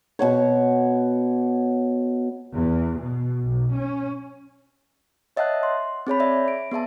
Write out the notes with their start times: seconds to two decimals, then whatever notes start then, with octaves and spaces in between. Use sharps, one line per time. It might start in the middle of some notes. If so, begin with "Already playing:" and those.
0.19 B2 F#4 C#5
2.55 E2
3.03 B2
3.44 B1
3.76 C#4
5.36 C#5 D#5 E5 F#5 A5 F#6
5.63 C6
6.07 C4 G#4 C#5 B5
6.20 D5 E5
6.48 D7
6.71 B3 G#4 E5 A5